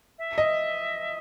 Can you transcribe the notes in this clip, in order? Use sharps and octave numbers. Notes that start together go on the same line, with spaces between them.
E5
D#5